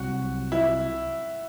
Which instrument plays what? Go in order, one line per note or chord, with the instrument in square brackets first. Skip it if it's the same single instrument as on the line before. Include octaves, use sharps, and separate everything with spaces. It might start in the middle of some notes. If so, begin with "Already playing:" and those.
Already playing: [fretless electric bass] C2 C3 F#3 [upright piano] F#4
[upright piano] E4